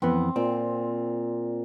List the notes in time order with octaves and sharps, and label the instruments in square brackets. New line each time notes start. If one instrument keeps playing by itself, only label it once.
[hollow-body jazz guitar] F2 E3 B3 [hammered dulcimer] C4
[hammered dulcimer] A#2 [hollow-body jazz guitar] C4